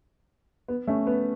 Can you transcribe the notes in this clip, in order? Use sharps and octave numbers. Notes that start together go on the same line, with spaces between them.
B3
A3 C#4
B3